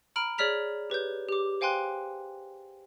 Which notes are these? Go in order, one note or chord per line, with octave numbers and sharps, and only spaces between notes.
A#5 B5 F6 D7 F#7
G#4 C#5 D5 F6 B6 F7
G4 B4 C#5 G6
G4 D6
C5 F5 G5 G#5 C6 F#6